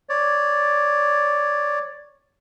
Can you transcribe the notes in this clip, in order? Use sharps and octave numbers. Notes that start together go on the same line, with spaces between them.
C#5 D5